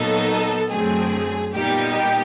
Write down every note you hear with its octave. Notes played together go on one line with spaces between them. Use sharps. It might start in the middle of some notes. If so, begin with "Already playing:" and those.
Already playing: A#2 F#3 B3 D#4 A4
F#2 D3 F#3 A3 C4 G#4
A#2 G3 B3 D#4 G4
G4